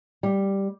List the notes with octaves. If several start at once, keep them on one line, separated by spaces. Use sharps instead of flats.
G3